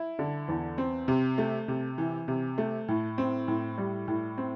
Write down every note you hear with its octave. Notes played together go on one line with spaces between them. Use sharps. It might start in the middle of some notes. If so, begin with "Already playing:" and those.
Already playing: E4
D3
E2
C4
C3
A3
C3
E3
C3
A3
A2
C4
A2
G3
A2
C4